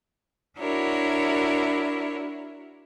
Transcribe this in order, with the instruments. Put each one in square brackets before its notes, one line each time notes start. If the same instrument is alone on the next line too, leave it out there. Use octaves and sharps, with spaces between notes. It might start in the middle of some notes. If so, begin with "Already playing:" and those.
[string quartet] D4 E4 F#4 A#4 C#5